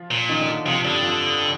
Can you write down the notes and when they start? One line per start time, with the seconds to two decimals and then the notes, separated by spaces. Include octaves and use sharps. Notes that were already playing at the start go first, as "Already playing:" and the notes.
Already playing: F3 F4
0.11 A#2
0.29 D#3 D#4
0.41 D3 D4
0.65 F2 C3 F3
0.84 G2 D3 G3
1.02 F2 F3